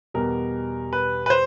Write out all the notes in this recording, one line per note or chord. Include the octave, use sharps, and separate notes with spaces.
E2 B2 G3 A#4
B4
B4
C5